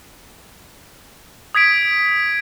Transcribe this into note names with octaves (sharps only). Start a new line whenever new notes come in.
D#6 G#6 B6 D7